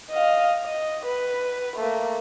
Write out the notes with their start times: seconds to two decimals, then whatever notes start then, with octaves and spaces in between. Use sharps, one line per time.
0.10 D#5 F5
0.64 D#5
1.05 B4
1.76 A3 A#3